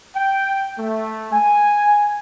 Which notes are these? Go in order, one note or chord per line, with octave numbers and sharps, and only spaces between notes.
G5
A3
G#5